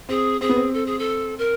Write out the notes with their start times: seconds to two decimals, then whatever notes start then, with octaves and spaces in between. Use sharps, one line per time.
0.09 C4 G#4
0.41 C4 G#4
0.49 B3
0.56 C4
0.74 A4
0.86 G#4
0.99 A4
1.38 A#4